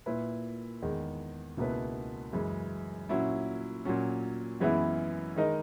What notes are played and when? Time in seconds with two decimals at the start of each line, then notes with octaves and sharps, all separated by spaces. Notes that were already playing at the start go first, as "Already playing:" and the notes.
0.06 A#2 A#3 E4 B4
0.82 E2 D#3 G#3
1.57 C#2 B2 A#3 E4 B4
2.33 F#2 C#3 E3 G#3
3.09 A#2 F#3 C#4 E4
3.85 A#2 F#3 C#4
4.60 F#2 E3 G#3 B3 E4
5.36 D#3 G#3 D#4 A#4 D#5